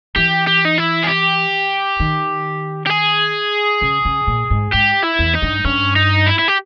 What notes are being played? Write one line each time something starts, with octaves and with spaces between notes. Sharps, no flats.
E3 G4
G4
D#4
E4
G#4
G4
D#3
G4
G#4
C#3
C#3
A#2
G#2
G#2 G4
E4
E2
D#4
G2
G2 C#4
D#4
E4
E4
G4